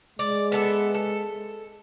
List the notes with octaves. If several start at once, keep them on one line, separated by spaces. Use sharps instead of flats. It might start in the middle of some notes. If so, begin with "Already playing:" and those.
G#3 D5
B3 A4 E5
A4